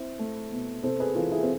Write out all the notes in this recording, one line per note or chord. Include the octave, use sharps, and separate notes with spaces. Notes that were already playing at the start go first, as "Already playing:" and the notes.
Already playing: C4 E4
A3
B2
C3 A4 C5
G#4 B4
E3 F4 A4
E4 G#4
C4